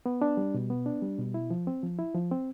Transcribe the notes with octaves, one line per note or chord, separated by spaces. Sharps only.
B3
D4
G3
B2
B3
D4
G3
B2
E4
F3
C4
F3
E4
F3
C4